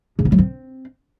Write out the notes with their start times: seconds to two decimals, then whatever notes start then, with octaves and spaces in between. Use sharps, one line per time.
0.19 C#3
0.25 B3
0.32 F#3
0.38 C4